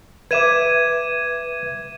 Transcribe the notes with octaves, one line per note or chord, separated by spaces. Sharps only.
B4 E5 D6 G#6 D#7 E7